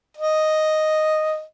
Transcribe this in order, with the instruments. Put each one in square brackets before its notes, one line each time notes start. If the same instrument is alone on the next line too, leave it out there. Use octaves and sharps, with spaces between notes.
[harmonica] D#5